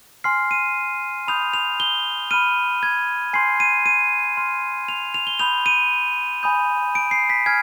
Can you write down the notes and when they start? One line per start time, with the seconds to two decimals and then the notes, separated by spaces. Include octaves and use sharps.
0.24 G#5 C6 F6 C7
0.51 D#7
1.28 B5 D#6 G6 F7
1.54 F7
1.80 G7
2.31 B5 F6 D#7
2.83 G#6
3.33 G#5 C6 G6 C7
3.60 D#7
3.86 D#7
4.37 C6 F6
4.88 F7
5.14 F7
5.27 G7
5.39 B5 D#6 G6 F7
5.66 D#7
6.43 G#5 B5 D#6 G6
6.95 D7
7.11 C7
7.30 B6
7.46 G#5 F6 G#6